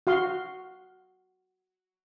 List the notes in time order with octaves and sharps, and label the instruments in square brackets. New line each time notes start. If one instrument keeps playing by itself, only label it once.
[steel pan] F#4 F5 C6